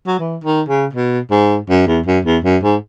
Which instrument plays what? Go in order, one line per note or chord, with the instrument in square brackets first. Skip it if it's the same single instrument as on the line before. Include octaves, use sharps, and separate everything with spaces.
[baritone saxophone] F#3
E3
D#3
C#3
B2
G#2
F#2
E2
F#2
E2
F#2
G#2